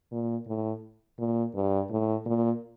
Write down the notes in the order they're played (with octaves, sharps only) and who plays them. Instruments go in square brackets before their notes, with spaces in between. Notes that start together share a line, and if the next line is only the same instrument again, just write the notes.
[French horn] A#2
A2
A#2
G2
A2
A#2